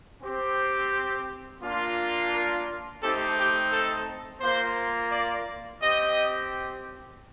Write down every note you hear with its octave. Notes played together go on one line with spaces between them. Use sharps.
C4 G4
A#3 D4 F4
A#4
A3 C4 D#4 G4 A4
G4
A4
A#3 F4 C5
D5
C4 G4 D#5